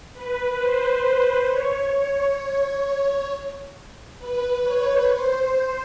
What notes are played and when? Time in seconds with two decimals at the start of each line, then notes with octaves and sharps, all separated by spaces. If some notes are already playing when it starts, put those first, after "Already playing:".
0.13 B4
0.59 C5
1.49 C#5
4.18 B4
4.63 C#5
5.08 C5